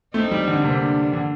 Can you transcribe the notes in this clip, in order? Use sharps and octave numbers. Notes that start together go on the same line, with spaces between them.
A3 C4 D#4
G3
D3
C3 A#3 D4
D3